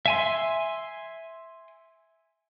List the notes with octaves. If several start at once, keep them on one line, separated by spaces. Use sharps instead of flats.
E5 G#5 C6